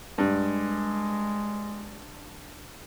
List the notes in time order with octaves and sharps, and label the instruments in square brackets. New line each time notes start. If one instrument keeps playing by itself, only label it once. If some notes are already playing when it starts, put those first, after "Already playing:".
[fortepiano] G2 [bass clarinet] G#3